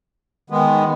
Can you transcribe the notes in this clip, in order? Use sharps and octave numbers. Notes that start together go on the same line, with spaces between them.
D#3 G#3 B3